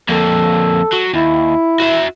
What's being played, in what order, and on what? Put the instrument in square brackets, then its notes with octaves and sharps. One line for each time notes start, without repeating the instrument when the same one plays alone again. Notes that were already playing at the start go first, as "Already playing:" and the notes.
[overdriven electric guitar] F2 A#3 [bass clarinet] A4
[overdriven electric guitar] F#3
[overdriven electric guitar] D#2 [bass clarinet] E4
[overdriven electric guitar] F#4 E5